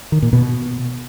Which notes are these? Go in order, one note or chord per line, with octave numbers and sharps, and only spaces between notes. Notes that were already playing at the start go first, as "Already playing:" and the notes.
D#3
A#2
B2